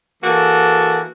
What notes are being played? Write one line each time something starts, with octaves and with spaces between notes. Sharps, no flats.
E3 A#3 F#4 G#4 A4